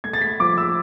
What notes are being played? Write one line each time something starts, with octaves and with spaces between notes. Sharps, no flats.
A3 G#6
A6
B6
F3 D6
E6